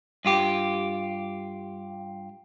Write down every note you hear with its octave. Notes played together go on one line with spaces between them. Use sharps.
G2 F4 G4